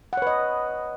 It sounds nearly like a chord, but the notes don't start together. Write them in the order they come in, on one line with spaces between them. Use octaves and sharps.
F#5 C#5 B4 D#5